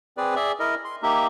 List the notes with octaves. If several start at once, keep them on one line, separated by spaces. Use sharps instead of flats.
C4 G#4 B4 D5
G#4 D5 E5
E4 A#4 D#5
C6
A#3 D#4 G4 E5